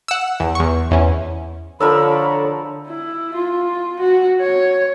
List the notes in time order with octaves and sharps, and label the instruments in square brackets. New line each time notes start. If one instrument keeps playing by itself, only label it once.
[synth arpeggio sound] F#5 E6
E2
E2 C#6
E2 C#4
[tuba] D3 [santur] F3 A#4 E6 [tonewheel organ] A4 C#5 [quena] B5
[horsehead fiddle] E4
F4
F#4
C#5